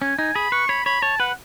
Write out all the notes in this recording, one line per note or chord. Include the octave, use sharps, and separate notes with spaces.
C#4 G#5
D#4 G#5
G#4 B5
B4 C#6
C#5 B5
C#5 B5
C#5 A5
B4 F#5